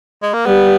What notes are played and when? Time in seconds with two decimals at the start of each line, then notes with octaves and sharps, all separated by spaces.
0.22 G#3
0.34 A#3
0.46 G3 B3